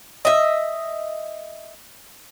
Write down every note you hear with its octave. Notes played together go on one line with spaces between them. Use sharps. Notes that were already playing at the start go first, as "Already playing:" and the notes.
D#5 E5